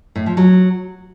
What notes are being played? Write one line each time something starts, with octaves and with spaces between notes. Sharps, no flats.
A2
F3
F#3